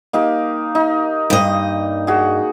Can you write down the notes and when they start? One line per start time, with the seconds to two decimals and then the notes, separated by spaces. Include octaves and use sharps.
0.13 A#3 D#4 G4
0.75 D#4
1.30 G2 D#5
2.07 F#4 G#4